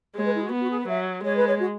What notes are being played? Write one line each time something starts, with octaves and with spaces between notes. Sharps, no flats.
G#3 C#5
B4
E4
F#4
B3
F#4
G#4
B4
F#3 E5
G#3 C#5
B4
C#5
F#4